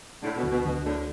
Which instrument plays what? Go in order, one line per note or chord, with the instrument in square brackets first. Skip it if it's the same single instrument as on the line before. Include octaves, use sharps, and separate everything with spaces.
[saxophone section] A2 D3 [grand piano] A3
[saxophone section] B2
[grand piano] D2
[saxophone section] B2
[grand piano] D2 [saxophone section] B2
[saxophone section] A2 D3 [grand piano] A3